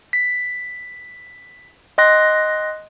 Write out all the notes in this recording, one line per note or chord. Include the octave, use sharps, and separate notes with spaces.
B6
D#5 G5 C6 F#6 A#6